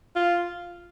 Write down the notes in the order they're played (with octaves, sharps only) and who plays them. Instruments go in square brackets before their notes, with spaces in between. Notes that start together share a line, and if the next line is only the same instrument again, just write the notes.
[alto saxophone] F4